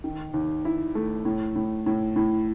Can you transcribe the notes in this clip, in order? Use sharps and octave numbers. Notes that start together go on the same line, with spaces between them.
D#3
D#2
E4
A3
A2
A2
A2
A2